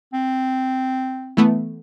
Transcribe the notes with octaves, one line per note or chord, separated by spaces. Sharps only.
C4
E3 A3 B3